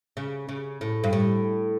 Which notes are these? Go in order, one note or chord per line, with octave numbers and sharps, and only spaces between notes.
C#3
C#3
A2
G2
A2